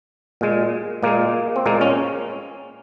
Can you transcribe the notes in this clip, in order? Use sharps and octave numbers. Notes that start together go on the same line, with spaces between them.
A#2 G#3
A#2 G#3 A#3
C4
A#2 G#3 A#3
C#4